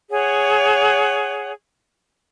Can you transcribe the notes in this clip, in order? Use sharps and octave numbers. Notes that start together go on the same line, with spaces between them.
G#4 C#5 F#5